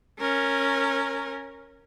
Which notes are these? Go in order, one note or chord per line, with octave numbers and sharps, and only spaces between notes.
C#4 A#4